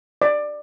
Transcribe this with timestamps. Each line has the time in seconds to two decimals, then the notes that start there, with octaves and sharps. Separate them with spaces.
0.22 D5